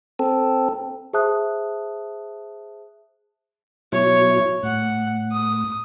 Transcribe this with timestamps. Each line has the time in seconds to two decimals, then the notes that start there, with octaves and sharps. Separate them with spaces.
0.19 C4 A4
1.13 G#4 C5 E5 A5 D#6 F#6
3.92 B2 F#3 E4 C#5
4.63 A2 F#5
5.32 D#6